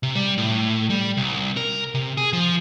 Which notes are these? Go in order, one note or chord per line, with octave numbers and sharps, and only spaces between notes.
C3
G3
A2
G3
C2
A#4
C3
G#4
F3